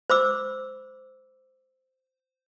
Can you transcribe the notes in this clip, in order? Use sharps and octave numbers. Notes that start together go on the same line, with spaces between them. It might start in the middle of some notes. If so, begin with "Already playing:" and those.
C5 B5 D6 E6